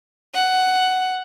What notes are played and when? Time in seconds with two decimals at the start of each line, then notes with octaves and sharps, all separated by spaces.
0.34 F#5